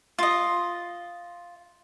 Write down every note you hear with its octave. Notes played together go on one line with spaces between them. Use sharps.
F4 D#5